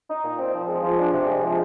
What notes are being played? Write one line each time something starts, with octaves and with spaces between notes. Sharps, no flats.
D#4
A#2
C4
F3
G#3
F3
D4
C3
G#3
F3